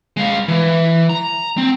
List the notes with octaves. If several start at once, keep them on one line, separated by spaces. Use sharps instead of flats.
G#3 F5
E3
A#5
C4